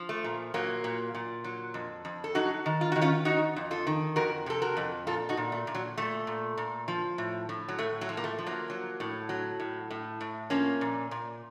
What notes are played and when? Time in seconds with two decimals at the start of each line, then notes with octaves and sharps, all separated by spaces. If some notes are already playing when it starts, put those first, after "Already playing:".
Already playing: F3
0.09 A3
0.24 A#2
0.54 A#2 F#3 A#3
0.84 A#2
1.15 A#2
1.44 F#3
1.74 F2
2.05 F2
2.24 A4
2.35 F#3 D#4 F#4
2.66 D#3
2.81 F4
2.92 D#3 F#4
3.01 C#4 F4
3.25 D#3 D#4 F#4
3.56 F2
3.71 F4 A4
3.87 D#3
4.16 F2 F#4 A#4
4.46 C3 A4
4.62 F#4 A#4
4.77 F2
5.07 A#2 F4 A4
5.29 D#4 F#4
5.37 A#2
5.52 A3
5.67 A#2
5.75 F#3
5.97 A#2 A3
6.27 A#2
6.58 A#2
6.88 F3
7.18 A2
7.49 A2
7.68 F#3
7.78 A2 A3
8.01 F#3
8.09 F3
8.17 A#3
8.24 A3
8.38 F3
8.46 F#3 A#3
8.70 F#3
9.00 A2
9.29 F#3
9.60 A2
9.91 A2
10.21 A2
10.50 F3 A#3 C#4
10.81 A#2
11.11 A#2